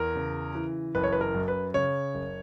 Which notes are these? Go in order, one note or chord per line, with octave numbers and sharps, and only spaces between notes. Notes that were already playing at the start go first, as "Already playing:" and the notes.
Already playing: E2 A#4
C#3
E3
F#1 B4
C#5
B4
A#4
F#2
B4
C#3 C#5
F#1